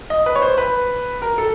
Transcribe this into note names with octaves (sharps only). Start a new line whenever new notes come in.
D#5
B4
C#5
C5
B4
A#4
A4